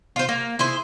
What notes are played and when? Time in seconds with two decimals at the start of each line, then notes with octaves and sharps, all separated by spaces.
0.16 F4 C5
0.29 A#3
0.59 E4 G#4 C5